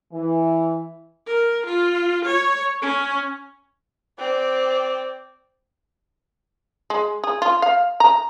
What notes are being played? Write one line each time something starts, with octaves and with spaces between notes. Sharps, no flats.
E3
A#4
F4
C#5
C#4
C4 D5
G#3
G#4
F4
F5
A#5